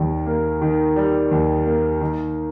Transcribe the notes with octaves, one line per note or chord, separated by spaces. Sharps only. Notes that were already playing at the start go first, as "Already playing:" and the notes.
Already playing: D#2 D#3 G3
A#3
D#3
G3
D#2
A#3
D#3